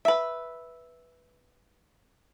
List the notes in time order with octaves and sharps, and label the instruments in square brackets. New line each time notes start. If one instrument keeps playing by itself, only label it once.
[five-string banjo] B4 E5